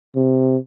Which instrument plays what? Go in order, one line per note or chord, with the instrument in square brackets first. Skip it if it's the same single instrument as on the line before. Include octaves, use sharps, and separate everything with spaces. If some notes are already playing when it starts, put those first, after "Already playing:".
[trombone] C3